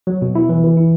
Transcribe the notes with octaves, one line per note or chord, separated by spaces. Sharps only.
F#3
B2
E4
E3
E3
E4